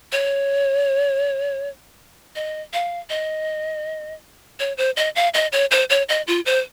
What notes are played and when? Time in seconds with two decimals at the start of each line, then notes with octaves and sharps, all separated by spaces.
0.12 C#5
2.36 D#5
2.73 F5
3.10 D#5
4.60 C#5
4.78 C5
4.97 D#5
5.16 F5
5.34 D#5
5.53 C#5
5.71 C5
5.90 C#5
6.09 D#5
6.27 F4
6.46 C5